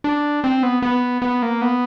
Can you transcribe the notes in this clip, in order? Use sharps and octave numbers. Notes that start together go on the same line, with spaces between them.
D4
C4
B3
B3
B3
A#3
B3